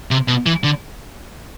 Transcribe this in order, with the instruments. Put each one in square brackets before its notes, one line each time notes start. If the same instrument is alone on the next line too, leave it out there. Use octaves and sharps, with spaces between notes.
[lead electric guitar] C3
B2
E3
D3